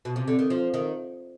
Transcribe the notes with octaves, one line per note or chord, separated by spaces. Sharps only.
B2
C3
D3
D#3
F3
D#3